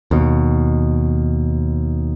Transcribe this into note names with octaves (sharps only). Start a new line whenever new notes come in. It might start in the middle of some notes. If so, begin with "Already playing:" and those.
D#2 B2